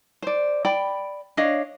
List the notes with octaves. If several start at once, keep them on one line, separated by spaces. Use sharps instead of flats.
C5 D5
D5 G5 B5
D4 C#5 D#5 F5